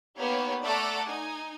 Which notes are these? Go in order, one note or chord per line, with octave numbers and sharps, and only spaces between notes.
A#3 B3 D#4 G4 C#5
A3 A4 D5 F#5 A#5 D6
D#4 G#5